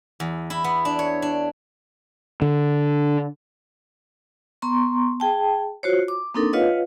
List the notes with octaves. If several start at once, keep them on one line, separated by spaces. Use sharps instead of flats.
E2
E4
B3
D4
C#5
D4
D3
B3 A#5 C6 C#6
G#4 G5 A5
F4 F#4 C5 C#5
D6
A#3 C4 D4 D#4 A4 A#4
F4 B4 C#5 D#5 F5 F#5